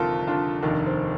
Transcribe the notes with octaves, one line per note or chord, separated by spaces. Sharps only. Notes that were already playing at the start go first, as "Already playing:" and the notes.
Already playing: G1 F2 C3 D#3 F4 A4 A#4
D4 F4
F1 D#2 D#3 D4
C4